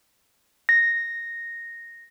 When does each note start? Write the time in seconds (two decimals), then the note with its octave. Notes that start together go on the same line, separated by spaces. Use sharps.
0.69 A#6